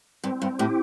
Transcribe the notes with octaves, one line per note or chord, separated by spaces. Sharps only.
G2 C4
G2
A2 G4